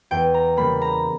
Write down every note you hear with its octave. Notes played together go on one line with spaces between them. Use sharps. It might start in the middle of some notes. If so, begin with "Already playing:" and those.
E2 G5
A#5
C#3 G3 A#3 B5
A#5